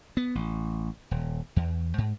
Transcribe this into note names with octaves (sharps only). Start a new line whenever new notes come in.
B3
A1
D#1
E2
G#2